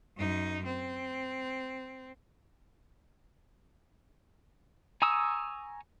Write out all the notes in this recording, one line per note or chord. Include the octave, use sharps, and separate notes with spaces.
F#2 D#4
C4
G#5 A#5 C#6 D#6 E6